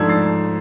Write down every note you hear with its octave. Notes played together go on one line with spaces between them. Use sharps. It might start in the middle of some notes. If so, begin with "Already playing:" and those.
Already playing: G#2 F3 A3 D4 E6 G#6
A6 C7